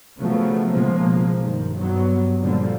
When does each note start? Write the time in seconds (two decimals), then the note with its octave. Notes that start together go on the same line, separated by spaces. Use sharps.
0.19 C#3 F3 F#3 A3 B3
0.71 B1 C#3 F3 G#3 A#3
1.40 G2 D#3
1.76 G2 F#3 B3
2.41 A#2 D3 F3 G3